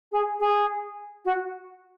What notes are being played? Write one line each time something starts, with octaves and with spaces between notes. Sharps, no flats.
G#4
G#4
F#4